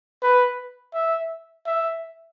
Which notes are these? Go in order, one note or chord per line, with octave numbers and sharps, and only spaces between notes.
B4
E5
E5